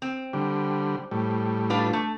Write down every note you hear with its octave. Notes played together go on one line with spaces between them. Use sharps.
C4
D3 G3
A2 G3
D4 F4 B4
A3